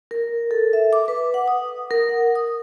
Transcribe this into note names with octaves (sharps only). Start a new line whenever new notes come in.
A#4
A4
E5
D6
B4
F#5
D#6
A#4
F#5
D#6